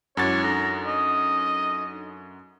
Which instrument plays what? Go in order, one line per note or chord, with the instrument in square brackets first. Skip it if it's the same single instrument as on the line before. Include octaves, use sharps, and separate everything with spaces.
[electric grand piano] F#2 F#4 A6 [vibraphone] G#3 E4 D6 [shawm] C#5
[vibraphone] D4 D#4 A4 [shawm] A#5
[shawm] D#5